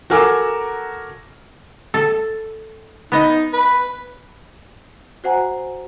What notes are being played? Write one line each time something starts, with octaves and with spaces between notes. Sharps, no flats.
F#4 A4 A#4 G#5 D6 E6
A4
B3 D#4 D#5
B4
F#4 C5 F#5 G#5 A#5